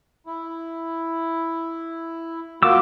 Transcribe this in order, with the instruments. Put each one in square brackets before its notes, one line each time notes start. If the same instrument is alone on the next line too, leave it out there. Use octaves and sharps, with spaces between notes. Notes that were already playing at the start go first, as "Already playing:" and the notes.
[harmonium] E4
[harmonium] A#3 F4 F#4 [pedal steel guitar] D6 E6